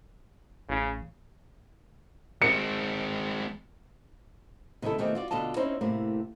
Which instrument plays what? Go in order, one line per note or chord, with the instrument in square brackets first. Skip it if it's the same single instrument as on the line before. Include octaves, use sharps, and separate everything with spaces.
[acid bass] A1 [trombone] C#3
[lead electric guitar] G#3 C4 [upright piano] C#7
[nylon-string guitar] C3 D#3 G#3 E4 A4
B2 D#3 E3 A3 C4 G4
F4 F#4 D5
B2 D3 F4 D#5 A5
C4 C#4 D#4 E4 C5
A2 C3 A3 A#3